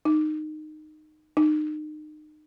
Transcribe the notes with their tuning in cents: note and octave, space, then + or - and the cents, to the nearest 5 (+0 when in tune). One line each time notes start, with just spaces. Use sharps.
D#4 -15
D#4 -30